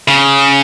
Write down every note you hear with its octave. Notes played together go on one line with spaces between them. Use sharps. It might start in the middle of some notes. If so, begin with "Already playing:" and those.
C#3